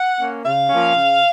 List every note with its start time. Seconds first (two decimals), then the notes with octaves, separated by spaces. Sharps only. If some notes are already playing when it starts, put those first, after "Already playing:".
Already playing: F#5
0.19 A#3 C#4
0.45 C#3 F5
0.70 F3 A#3 C#4
0.95 C#3